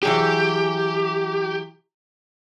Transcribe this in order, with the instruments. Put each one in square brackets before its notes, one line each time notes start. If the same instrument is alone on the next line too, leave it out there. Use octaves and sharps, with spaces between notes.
[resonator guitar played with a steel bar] E3 F#3 G#4 [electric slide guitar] G4